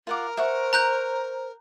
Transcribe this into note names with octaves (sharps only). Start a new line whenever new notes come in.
F4 A#4 F#5 D6
C5 E5 F#5 C#6
A#5 F#6 G6